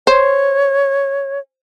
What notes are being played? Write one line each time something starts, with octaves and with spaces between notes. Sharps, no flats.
C5 C#5